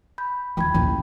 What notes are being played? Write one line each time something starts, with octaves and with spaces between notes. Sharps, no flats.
B5 G6
D#2 D#3 G5 B5 G#6
A1 D#2